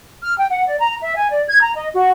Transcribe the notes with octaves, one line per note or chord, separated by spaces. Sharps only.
F6
G5
F#5
D5
A#5
E5
G#5
D5
G#6
A#5
D#5
F#4